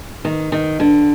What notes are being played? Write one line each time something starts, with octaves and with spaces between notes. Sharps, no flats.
D#3
D#3
D3